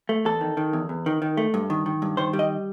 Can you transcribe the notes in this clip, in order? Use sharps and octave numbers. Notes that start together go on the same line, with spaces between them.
A3
E2 A4
D#3
D#3
E2
E2
D#3
D#3
A3
G2
D#3
D#3
G2
D#3 C5
G3
D#5